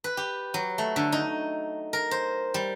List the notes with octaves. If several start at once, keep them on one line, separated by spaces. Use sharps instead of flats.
B4
G4
F#3
A3
D3
D#4
A#4
C5
G3